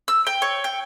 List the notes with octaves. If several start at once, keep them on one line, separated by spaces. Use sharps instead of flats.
E6
G5
C#5
G5